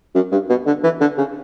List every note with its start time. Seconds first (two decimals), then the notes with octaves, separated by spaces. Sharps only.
0.15 F#2
0.32 G2
0.50 B2
0.67 D3
0.83 E3
1.01 D3
1.18 C#3